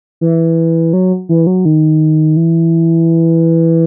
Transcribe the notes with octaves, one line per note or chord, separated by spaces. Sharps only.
E3
F#3
E3
F#3
D#3
E3